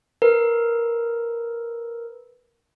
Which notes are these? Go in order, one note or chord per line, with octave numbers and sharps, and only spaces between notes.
A#4 B4